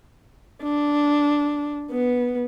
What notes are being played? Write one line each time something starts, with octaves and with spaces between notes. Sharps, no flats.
D4
B3